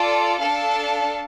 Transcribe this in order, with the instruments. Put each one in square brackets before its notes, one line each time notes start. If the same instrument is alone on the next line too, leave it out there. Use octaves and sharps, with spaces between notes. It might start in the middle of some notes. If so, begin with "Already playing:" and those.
Already playing: [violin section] F4 A4 D5
D4 A4 F5 A5